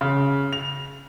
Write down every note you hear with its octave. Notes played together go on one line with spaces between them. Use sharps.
C#3
F7